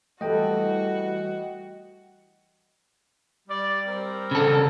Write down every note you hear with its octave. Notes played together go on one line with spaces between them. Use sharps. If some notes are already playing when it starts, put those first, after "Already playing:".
E3 G3 A3 F#4 A4 D#5 G5
G3 D5
G3 C4 A#4
C#3 A4